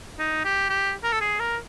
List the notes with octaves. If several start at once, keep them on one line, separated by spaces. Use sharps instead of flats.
D#4
G4
G4
A#4
A4
G#4
A#4